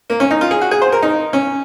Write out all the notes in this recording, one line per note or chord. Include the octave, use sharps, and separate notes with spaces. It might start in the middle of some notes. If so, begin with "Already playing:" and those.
A#3
C#4
D#4
F4
G#4
F#4
G#4
C5
A#4
D#4
C#4